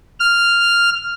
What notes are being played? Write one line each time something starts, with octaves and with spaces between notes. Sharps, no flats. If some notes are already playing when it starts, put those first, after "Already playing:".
F6